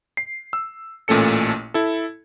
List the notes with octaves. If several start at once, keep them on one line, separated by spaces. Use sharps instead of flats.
C7
E6
A1 A#2 A3 C#4 A4 C#7
E4 A4